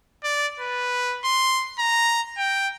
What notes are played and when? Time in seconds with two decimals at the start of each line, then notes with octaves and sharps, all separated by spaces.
0.24 D5
0.60 B4
1.24 C6
1.79 A#5
2.38 G5